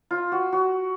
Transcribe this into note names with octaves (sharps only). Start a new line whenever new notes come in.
F4
F#4
F#4